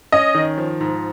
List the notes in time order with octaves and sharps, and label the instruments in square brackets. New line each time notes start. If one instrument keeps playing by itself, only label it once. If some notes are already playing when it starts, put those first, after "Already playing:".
[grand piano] C#4 [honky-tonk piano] D#5
[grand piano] D#3
F3
G#2